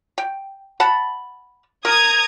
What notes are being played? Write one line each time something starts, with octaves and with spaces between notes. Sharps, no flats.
G5
F#5 A5 B5
A#4 A#5 D#6 G#6